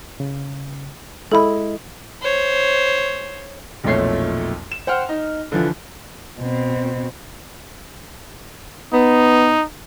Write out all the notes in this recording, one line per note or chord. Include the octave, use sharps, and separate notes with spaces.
C#3
G#3 E4 A4 D#5 B5
C5 C#5
B1 F2 A#2 A3 C#5 C7
E7
C5 F#5 G5 F6
D#4
D3 E3 F3
B2 C4
B3 D#4